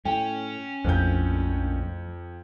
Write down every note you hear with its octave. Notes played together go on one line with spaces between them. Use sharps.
A2 C#4 G5
A#1 F2 A2 F3 G6